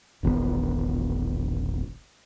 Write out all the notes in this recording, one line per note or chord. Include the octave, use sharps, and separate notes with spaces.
E1 A#1 D#3 B3